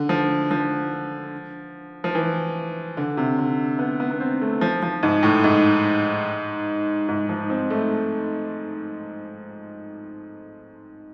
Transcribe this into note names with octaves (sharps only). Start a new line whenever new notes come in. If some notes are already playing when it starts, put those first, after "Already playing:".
Already playing: D3
F3
F3
F3
E3
D3
C3
D3
B3
B3
B3
C4
A3
F3
F3
G#2
A2
G#2
G#2
F3
C4
A3